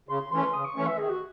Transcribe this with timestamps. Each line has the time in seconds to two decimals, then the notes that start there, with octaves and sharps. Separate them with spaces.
0.09 C#3 C6
0.31 E3 A3 C#4 C6
0.53 C#3 D#6
0.65 C#6
0.76 E3 A3 C#4 C#6
0.87 E5
0.98 D#3 G#4
1.10 F#4